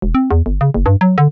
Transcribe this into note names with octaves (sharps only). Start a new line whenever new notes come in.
E1
C4
E2
G1
C#3
F#1
G2
F#3
D3